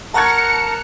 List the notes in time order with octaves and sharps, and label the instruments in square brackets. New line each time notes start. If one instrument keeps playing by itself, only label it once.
[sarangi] A#4 [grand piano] F#5 C#6 G#6 [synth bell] A5 A#5 F#6 [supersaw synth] C#7